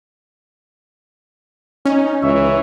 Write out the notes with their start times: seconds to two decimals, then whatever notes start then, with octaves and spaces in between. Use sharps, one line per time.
1.86 C#4 D#4
2.23 C#2 E3 C#5 E5